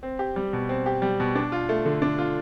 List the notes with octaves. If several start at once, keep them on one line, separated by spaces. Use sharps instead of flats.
C4
G4
G3
B2
C4
G4
G3
B2
D4
F4
A3
D3
D4
F4